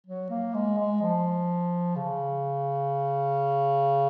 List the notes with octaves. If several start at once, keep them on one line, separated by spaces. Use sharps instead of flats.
F#3
A#3
G#3
G#3
F3
C#3